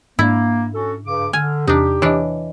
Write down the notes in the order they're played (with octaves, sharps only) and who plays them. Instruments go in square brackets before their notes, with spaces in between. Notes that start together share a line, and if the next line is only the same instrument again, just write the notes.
[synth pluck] G#2 D4 [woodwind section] A#3 [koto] E4
[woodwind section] C#4 F#4 A4
G2 C#3 D6
[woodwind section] D3 [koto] G#5 [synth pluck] F6
[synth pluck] E2 C3 [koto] D4 D#4 [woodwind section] G4
[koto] E3 D4 [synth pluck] C#5 D#5